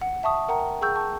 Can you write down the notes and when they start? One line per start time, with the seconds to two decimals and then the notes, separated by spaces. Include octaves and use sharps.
0.02 F#5
0.23 E5 A5 C#6 D#6
0.48 A#4 F#5 G5 A#5
0.81 G#4 G5 C#6 E6 G6
0.95 A5 C#6